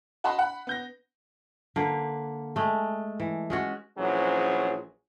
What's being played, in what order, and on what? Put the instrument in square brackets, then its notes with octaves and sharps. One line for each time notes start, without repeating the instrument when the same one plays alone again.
[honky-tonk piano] F#4 D#5 A5 B5 C6
F#5 B5
B3 G6 A#6
[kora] D3 A#3 B4
G#3 A3
E3
G#3 C#4 F#4
[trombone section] A#1 E3 F#3 C#4 G#4 C5